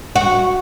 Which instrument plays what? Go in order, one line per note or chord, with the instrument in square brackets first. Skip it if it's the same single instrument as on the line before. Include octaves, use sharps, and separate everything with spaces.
[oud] F#4